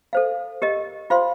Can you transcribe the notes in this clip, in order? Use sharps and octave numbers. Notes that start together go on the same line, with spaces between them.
A4 C5 F5
G4 A#4 D#5
F4 C5 F5 C6